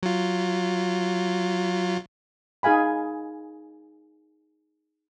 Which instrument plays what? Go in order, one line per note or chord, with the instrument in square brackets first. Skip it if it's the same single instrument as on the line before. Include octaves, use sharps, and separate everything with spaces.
[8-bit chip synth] F#3 F4
[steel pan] D#4 G#4 F5 G#5 B5